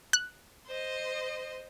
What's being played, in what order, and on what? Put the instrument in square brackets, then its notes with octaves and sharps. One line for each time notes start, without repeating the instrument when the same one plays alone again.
[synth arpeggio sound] F#6
[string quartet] C5 D#5